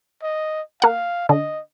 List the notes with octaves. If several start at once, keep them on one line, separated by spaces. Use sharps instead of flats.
D#5
A#3 F5 F#5
D3 D#5